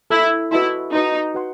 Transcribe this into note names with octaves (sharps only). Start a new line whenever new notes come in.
E4 A4 E5 B5
E4 F#4 B4 D#5 A5 C6
D#4 F#4 B4 D#5 A5 C6
F#4 B4 F#5 C6